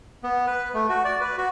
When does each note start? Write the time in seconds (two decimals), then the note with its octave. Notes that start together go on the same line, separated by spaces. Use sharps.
0.23 B3
0.47 B4
0.74 A3
0.89 F#4
1.05 D5
1.21 B4
1.38 F#4